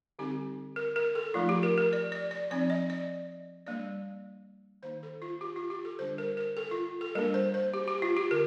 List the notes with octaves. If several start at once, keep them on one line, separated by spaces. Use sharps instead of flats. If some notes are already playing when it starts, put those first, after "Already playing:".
D3 G3 C4 D#4 G4
A#4
A#4
A4
F3 A3 D#4 F4
G4
A#4
A#4
D5
D5
D5
F3 C4 D#4 D5
D#5
D5
G3 A#3 D4 D5
D#3 A#3 D#4 C5
A4
F4
G4
F4
G4
A4
D3 G3 D4 C5
A#4
A#4
A4
F4
A4
G3 A#3 D4 A#4
C5
C5
G4
G4
F4
G4
D3 A#4